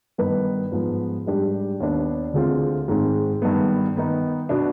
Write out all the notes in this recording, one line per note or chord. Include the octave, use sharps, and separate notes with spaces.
G2 D#3 B3 D#4 B4
G#2 F3 B3
G#2 G3 D4 G4
D#2 D#3 B3 D4
D2 D3 G#3 C4 F4
G#2 D#3 G#3 C4
G2 D#3 B3
D#3 B3 D#4
B2 B3 D4